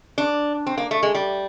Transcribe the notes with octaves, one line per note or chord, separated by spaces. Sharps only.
D4
C4
A#3
A3
G#3
G3